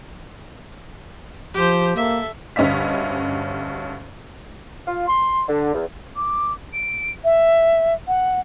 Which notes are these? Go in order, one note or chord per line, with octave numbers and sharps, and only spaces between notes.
F3 G4 C5
A#3 A4 E5
D2 G2 C#4 D#5 E5 B6
F4
C6
D3
E2
D6
D7
E5
F#5